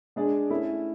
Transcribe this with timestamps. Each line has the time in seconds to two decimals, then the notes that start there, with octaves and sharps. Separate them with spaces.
0.16 G#3 D4 G#4 D5
0.50 A3 C#4 E4